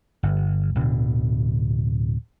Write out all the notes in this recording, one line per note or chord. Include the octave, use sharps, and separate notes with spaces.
G1
D1 B2 D3